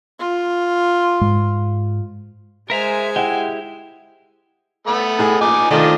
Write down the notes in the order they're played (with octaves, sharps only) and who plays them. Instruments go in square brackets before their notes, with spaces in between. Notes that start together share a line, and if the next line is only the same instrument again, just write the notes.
[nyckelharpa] F4
[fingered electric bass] G#2 G#3
[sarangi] G#3 [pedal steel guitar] A#4 E5 A#5 [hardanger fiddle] C5 G#5
[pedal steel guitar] E4 G4 [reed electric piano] D#5 F#5 G5
[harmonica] A3 B3 B5
[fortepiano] A2 G#4
[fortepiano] A#1 [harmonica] D#4 G#5 D6
[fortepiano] D#3 A3 F4 [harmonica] F3 D4 D#5